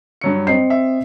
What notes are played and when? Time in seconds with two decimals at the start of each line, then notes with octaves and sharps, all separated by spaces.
0.21 G2 F#3 C#7
0.47 C4 D#5 C7
0.70 E5